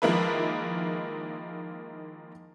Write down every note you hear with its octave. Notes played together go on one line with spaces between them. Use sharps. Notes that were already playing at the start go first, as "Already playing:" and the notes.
D#3 F3 G#3 A#3 E4 B4